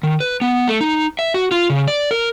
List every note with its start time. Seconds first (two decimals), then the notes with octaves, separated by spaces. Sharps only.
0.03 D#3
0.20 B4
0.41 B3
0.68 A3
0.81 D#4
1.19 E5
1.34 F#4
1.51 F4
1.70 C#3
1.88 D5
2.11 A#4